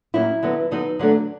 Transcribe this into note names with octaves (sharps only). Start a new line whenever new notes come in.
A2 F#3 A#3 C#4 E4
D3 F#3 B3
D3 F#3 B3 D#4
D3 F#3 A3 D4